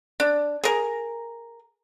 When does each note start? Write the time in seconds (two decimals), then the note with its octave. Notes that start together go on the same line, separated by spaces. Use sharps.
0.20 D4
0.64 G#4 A#4